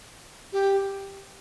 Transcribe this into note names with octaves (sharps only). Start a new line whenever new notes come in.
G4